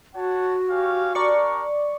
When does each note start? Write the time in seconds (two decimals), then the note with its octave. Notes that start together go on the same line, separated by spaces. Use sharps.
0.16 F#4 C#5 F#5 A5
0.71 C#4 G4 F5
1.15 D4 G4 A#4 D5 C#6